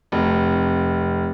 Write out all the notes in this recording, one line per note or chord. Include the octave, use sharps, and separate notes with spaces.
F1